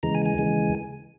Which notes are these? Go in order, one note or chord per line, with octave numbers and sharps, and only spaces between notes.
D#2 C#3 E3 G#3 A#5
G#5
G#5
D#2 C#3 E3 G#3